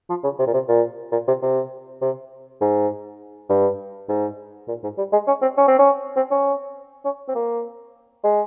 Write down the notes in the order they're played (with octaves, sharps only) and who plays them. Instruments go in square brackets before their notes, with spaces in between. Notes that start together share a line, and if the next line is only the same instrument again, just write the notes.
[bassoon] F3
C#3
C3
A#2
C3
A#2
A#2
C3
C3
C3
G#2
G2
G#2
A#2
G#2
G3
G#3
C#4
C4
C#4
C4
C#4
C4
C#4
C#4
C4
A#3
G#3